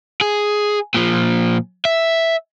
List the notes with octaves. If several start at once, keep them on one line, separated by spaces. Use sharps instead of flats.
G#4
A#2 F3
E5